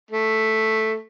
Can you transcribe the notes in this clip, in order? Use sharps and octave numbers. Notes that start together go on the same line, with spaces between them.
A3